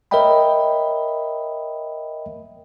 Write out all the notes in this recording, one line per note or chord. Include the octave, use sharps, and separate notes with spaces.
A#4 C#5 D#5 E5 G5 B5